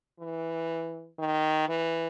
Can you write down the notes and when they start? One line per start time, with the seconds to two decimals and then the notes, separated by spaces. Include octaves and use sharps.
0.20 E3
1.19 D#3
1.68 E3